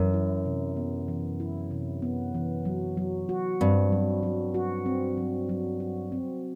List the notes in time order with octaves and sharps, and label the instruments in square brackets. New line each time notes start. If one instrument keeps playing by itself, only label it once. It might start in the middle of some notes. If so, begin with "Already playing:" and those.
Already playing: [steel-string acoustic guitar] F#2 [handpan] E3
[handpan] E4
C3
B3
E3
E4
C3
B3
E3
F#3
F#3
F#4
[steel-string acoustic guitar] G2 [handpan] C4
[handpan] F#3
F#3
F#4
C4
F#3
F#3
F#4
C4